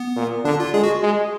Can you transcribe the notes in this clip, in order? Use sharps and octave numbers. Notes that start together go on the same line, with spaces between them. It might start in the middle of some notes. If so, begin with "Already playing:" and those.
Already playing: B3
A#2
D3 D4
F4
G#3 G#4
F#4
G#3